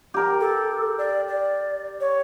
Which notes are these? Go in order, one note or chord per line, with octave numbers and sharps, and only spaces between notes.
G4 A#4
A4
D5
D5
C#5